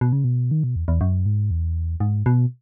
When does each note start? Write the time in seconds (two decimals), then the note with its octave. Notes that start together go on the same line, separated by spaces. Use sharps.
0.01 B2
0.13 C#3
0.24 B2
0.51 D#3
0.64 B2
0.76 E2
0.88 E2
1.01 F#2
1.26 G#2
1.51 E2
2.00 G#2
2.26 B2